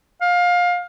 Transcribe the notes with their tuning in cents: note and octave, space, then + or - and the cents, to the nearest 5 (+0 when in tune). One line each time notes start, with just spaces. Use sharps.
F5 +25